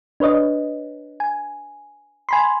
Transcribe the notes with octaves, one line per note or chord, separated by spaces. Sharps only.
D4 B4 C#5 D#5
G#5
G#5 B5 C6